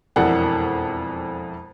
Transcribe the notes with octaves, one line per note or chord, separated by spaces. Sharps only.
E1 F2 E3 D5 F#5